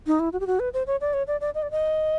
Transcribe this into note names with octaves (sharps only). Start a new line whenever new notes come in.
D#4
E4
F#4
G4
F#4
B4
C5
C#5
D5
C#5
D5
D5
D#5
D5
D#5